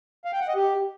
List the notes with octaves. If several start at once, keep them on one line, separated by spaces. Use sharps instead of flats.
F5
G5
F#5
D#5
G4